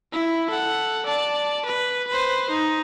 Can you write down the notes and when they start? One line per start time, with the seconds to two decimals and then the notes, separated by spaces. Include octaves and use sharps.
0.13 E4
0.50 A4 F#5
1.06 D5 A5
1.65 B4
2.08 B4 C5
2.50 D#4